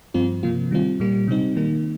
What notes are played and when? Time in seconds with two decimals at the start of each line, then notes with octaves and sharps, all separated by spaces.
0.14 G2 F3 C4 F4
0.43 C3 F3 A#3 F4
0.71 D#3 G3 C4 F4
1.00 A#2 G3 A#3
1.28 C3 G3 C4 D#4
1.56 D#3 G3 A#3 D#4